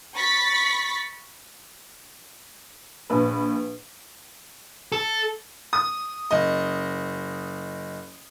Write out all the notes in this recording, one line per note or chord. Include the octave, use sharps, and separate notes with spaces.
B5 C#6 A6 B6
A#1 B4
A4
D#6
F#1 D#5